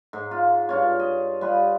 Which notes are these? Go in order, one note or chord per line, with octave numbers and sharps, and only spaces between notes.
G#2
F4
G2 F4 C#5
D#5
G3 F4 B4